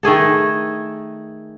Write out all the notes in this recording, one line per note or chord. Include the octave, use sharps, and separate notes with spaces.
D#3 A3 G#4 A4